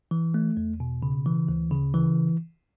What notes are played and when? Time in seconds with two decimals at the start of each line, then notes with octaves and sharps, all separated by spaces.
0.11 E3
0.34 A3
0.57 E2
0.80 B2
1.03 C#3
1.26 E3
1.48 D2
1.71 C#3
1.94 E3